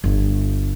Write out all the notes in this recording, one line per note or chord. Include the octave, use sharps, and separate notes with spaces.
G1